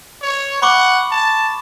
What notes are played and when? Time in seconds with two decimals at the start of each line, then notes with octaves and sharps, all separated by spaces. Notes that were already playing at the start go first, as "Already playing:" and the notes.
0.22 C#5
0.62 F#5 B5 C#6 D6
1.11 A5